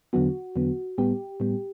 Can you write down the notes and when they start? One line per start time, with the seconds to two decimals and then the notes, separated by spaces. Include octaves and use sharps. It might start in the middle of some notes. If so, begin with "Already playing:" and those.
0.13 E2 D3 F#3 B3 F#4
0.56 E2 D3 F#3 B3
0.98 A2 G3 B3 G4
1.40 A2 G3 B3